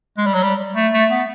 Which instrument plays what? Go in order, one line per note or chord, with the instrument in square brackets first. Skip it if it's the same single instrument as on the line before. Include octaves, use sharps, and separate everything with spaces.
[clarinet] G#3
G3
F#3
G3
A3
A3
B3